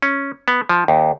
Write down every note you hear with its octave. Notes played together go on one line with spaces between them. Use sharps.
C#4
B3
F3
D#2